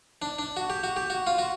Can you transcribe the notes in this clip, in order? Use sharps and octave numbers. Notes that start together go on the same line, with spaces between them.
D4
D4
F#4
G4
F#4
G4
F#4
F4
F#4